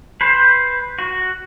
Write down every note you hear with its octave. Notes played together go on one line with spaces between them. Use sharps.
B4 C5
F#4